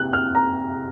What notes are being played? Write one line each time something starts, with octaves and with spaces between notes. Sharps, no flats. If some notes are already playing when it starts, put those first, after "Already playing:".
Already playing: C3 F#6
F6
A#5